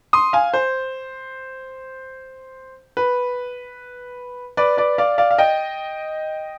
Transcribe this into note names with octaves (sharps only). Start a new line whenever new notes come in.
C6 D#6
F5 G#5
C5
B4
B4 D5
B4 D5
D5 F5
D5 F5
F5
D#5 G5